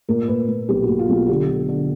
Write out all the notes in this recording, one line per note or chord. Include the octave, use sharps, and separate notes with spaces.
A#2 A#4
A#2 B4
A#2
B1 G4
F#4
A#2
F4
B1 F#4
D3 G4
D3
D3